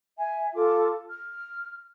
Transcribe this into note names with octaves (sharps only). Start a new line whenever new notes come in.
E5 G#5
F4 A4 D6
F6